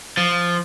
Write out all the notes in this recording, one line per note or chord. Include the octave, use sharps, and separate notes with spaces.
F3